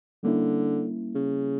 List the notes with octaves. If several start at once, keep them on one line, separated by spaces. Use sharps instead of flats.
D3 G3 A#3 C#4 E4
C#3